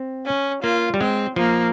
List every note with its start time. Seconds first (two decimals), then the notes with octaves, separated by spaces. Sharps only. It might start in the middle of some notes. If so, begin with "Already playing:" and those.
Already playing: C4
0.26 C#4
0.63 A#3 F4
0.94 G3
1.00 G#3 C4
1.36 F3 A#3